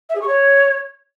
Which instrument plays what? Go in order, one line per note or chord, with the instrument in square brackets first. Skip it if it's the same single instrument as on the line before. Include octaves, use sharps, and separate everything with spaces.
[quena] E5
G#4
C#6
C#5